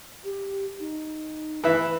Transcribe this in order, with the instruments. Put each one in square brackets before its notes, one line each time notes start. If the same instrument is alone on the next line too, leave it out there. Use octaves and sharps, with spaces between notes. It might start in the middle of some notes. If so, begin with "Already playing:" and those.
[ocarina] G4
D#4
[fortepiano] E3 E5 [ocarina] B4